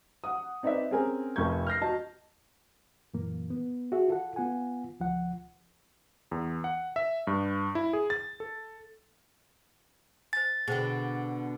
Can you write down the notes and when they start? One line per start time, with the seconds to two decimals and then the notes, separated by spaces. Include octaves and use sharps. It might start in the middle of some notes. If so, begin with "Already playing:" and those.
0.24 F#5 D#6
0.63 C4 D#4 B4 D5 E5
0.91 C4 C#4 G#4 A#4 G#5
1.36 F1 F2 A#4 C#6 G6 G#6
1.67 F6 G6 A#6 C7
1.82 F#4 D#5 A5
3.14 F#2 A#2 E3 A#3
3.50 B3
3.92 F#4 G#4 E5
4.08 F4 A4 F#5
4.36 B3 F4 F#5 G#5
5.00 C#2 F3 F#5
6.31 E2
6.64 F#5
6.96 E5
7.27 G2
7.75 E4
7.93 G#4
8.10 A6
8.40 A4
10.33 C5 G#5 A6
10.68 B2 D3 G#4 C5 G5